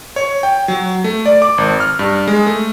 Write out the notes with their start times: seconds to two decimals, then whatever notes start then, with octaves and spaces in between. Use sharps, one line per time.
0.16 C#5
0.43 G5
0.68 F#3
1.04 A3
1.26 D5
1.42 D6
1.58 G#1
1.80 F6
1.99 G2
2.28 G#3
2.46 A3